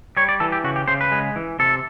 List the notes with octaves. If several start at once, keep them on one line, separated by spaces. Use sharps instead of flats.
G3 C#5
D5
E3 A4
G4
C#3 F#4
G4
C#3 C5
B4
G#3
E3
C3 A4